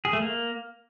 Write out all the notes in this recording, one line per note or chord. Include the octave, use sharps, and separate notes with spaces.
G#4
A3
A#3